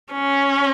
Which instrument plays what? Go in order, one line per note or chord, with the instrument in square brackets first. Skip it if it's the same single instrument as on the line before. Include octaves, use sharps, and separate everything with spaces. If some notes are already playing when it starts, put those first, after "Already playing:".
[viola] C#4